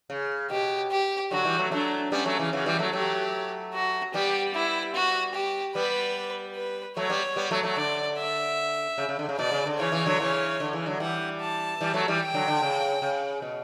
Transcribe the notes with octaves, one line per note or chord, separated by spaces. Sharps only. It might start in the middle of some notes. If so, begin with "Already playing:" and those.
C#3
B2 G4
G4
D3 F#3 F#4
E3 G3
F#3 A3
F#3 A3 D4
G3 B3 C#4
F#3 A3
C#3 E3
C#3 E3 F#4
E3 G3
F#3 A3
F#3 A3 G4
F#4
G3 B3 G4
E4
F#4
G4
G3 B3 B4
B4
F#3 A3 C#5
G3 B3
G3 B3
F#3 A3
F#3 A3
D3 D5
E5
C#3
C#3
D3
C#3
B2 D5
C#3
D3
C#3 E3 C#5
C#3 E3
D3 F#3
C#3 E3
D3
C#3 E3
D3 F#3
E3 G3 F#5
A5
E3 G3
F#3 A3
E3 G3
G5
D3 F#3
D3
C#3
C#3
B2